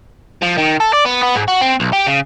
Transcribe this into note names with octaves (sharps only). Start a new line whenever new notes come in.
F3
D#3
A4
D5
B3
B3
G#2
F#4
C4
B1
G4
C#3